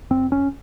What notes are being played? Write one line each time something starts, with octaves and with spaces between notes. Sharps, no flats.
F1 C4
C#4